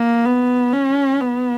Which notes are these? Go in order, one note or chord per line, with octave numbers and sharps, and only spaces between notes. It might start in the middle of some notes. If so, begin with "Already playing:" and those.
Already playing: A#3
B3
C#4
B3